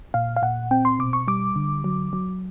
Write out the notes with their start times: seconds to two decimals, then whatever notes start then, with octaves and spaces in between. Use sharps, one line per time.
0.14 A#2 F5
0.36 F5
0.42 A#2 F#5
0.71 C4 G5
0.85 C6
0.99 B2 D6
1.13 C#6
1.28 G3 D6
1.56 D3
1.84 F#3
2.13 F#3